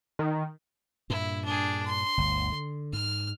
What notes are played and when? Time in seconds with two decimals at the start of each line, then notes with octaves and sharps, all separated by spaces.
0.19 D#3
1.10 G2 A#2 E4
1.45 D4 G#4
1.85 C6
2.17 G1 D2
2.52 D3
2.93 G#2 F6